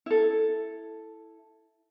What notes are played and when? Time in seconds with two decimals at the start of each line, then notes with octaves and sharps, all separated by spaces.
0.06 E4 A4